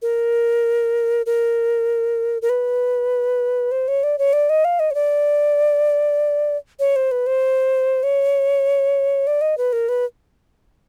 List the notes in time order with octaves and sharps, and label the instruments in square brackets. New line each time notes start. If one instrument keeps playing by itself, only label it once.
[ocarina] A#4
A#4
A#4
B4
C5
C#5
D5
C#5
D5
D#5
F5
D#5
C#5
D5
C#5
C5
B4
C5
C#5
D5
D#5
B4
A#4
B4